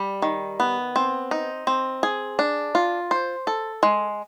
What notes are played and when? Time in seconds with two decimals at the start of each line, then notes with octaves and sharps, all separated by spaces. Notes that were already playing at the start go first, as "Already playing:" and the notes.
Already playing: G3
0.22 D#3
0.60 B3
0.96 C4
1.31 D#4
1.67 C4
2.03 G#4
2.39 D4
2.75 F4
3.11 C5
3.47 A4
3.83 G#3